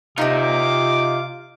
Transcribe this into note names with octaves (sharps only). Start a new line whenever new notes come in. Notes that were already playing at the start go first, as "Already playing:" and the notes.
C3 C4 D#4 F4 A#5 D6